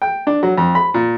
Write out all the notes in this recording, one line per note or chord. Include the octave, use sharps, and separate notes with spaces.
G5
D4
F#3
F2
B5
A#2